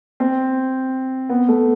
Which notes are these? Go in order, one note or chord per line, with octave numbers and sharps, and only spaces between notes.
C4
B3
A3